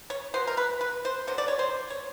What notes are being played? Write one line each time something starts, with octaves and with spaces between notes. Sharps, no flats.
C#5
B2 F#3 B3 C5
A#4
B4
B4
C5
D3 F#3 B3 C5
D5
C#5
C5
C#5